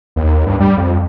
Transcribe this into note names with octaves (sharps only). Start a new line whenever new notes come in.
D#2
G2
G3
F2